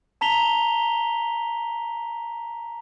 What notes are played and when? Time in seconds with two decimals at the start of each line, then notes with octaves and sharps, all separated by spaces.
0.21 A5 A#5 B6 F7 G7